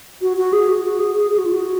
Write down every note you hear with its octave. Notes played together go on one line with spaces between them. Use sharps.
F#4
F#4
G#4
F#4
F#4
G#4
G#4
G#4
F#4
F4
F#4